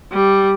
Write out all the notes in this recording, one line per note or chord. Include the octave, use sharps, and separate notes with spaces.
G3